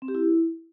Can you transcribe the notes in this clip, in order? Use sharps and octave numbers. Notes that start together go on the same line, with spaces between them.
C4
G4
E4